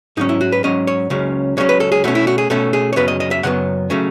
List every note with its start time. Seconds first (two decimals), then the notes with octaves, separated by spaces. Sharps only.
0.17 G#2 F#3 C#4 D#4
0.29 E4
0.41 F#4
0.52 B4
0.64 G#2 F#3 C#4 D#5
0.87 C#5
1.10 C#2 C#3 F#3 C#4
1.57 C#2 C#3 F#3 C#4 C#5
1.69 B4
1.80 A4
1.92 G#4
2.04 B2 A3 C#4 F#4
2.15 E4
2.27 F#4
2.38 G#4
2.50 B2 A3 C#4 A4
2.73 G#4
2.93 C#5
2.96 F#2 C#3 F#3 B3 B4
3.08 D#5
3.20 D#5
3.31 E5
3.43 F#2 C#3 F#3 B3 F#5
3.90 C#3 F#3 A3 C#4